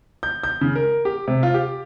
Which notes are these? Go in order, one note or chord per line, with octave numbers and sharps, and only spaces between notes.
G6
G6
C#3
A#4
G4
C3
F4
G4